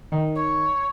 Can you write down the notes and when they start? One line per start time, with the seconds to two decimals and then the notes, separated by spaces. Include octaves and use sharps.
0.12 D#3
0.35 C#5